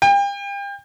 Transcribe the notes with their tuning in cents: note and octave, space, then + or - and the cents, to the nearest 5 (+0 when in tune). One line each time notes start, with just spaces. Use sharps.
G5 +35